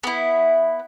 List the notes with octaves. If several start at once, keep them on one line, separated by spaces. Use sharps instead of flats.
B3 E4